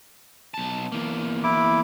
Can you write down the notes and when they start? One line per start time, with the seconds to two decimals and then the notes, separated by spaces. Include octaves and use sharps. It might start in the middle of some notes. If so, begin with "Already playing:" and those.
0.54 B1 A5
0.92 E2 A#3
1.43 E4 D6